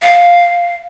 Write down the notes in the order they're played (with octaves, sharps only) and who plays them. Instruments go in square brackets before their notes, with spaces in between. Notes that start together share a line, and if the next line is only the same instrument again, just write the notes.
[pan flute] F5